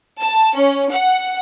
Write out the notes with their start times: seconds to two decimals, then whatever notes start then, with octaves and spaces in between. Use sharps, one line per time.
0.19 A5
0.54 C#4
0.90 F#5